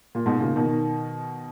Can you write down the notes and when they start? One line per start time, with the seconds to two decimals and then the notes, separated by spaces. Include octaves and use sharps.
0.15 A#2
0.26 G#2 B2
0.40 A#2 C#3
0.56 B2 D#3